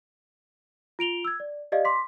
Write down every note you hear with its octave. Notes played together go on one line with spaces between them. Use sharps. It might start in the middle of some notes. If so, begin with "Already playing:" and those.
F4 D7 F7 G7
E6 G#6
D5
G4 D5 D#5 F5
C6 D6 B6